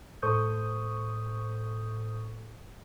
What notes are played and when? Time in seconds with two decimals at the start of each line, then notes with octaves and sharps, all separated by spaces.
0.22 A2 A4 C5 C#6 D#6 G6